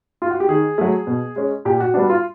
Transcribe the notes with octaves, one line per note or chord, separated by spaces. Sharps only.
F4
F#4
G4
D#3 G#4
F#3 A3
B2
G#3 C#4
A#2 G4
F#4
G3 B3 D4 F#4
F4